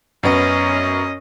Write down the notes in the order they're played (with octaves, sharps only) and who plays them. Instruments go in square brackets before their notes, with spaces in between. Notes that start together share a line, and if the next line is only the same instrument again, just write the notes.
[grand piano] F#2 B3 [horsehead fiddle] C#4 D#5